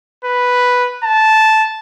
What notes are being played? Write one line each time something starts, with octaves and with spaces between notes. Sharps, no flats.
B4
A5